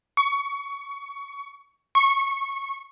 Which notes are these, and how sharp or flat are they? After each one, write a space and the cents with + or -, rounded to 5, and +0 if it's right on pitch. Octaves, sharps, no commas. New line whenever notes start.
C#6 +20
C#6 -15